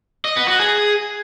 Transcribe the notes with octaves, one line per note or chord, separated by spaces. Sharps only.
D#5
B3
F#4
G#4